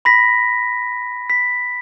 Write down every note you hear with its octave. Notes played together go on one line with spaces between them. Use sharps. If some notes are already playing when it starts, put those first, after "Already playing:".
B5 A#6 B6
B6